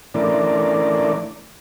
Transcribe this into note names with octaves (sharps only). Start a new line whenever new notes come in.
E3 A3 C#4 D4 A#4 D5